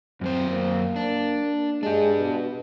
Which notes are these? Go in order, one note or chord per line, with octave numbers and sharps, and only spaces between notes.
F#2 F#3 C4 C5
A#3
D4
G#3 D4 G4
B2